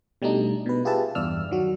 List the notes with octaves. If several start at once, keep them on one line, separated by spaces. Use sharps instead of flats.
B2 G3 A3 D4 D#4
B2 B4
F4 G4 G#4 B4 E5 A5
E2 G2 D5 E6 F6
D#3 F#3 F#4